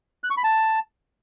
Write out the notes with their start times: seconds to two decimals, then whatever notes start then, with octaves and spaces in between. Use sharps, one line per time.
0.24 F#6
0.30 C#6
0.37 B5
0.44 A5